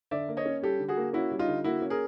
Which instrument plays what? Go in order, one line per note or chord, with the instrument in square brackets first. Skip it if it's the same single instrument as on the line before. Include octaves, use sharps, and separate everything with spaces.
[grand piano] D3 D5 E5
A#3
C#5 D#5
C#4
G3 G4 A4
D3
F#4 G#4
A#3
C#4 E4 F#4
G3
D#4 F4
D3
A#3 E4 F#4
C#4
G#4 A#4